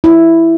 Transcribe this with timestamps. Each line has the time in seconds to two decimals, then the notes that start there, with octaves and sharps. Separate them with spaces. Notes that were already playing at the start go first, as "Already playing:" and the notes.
0.04 E4